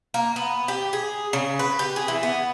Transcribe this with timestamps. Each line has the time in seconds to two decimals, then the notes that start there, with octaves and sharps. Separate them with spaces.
0.14 A#3
0.36 B3
0.68 G4
0.93 G#4
1.33 C#3
1.59 B4
1.79 G4
1.96 G#4
2.08 E3
2.23 B3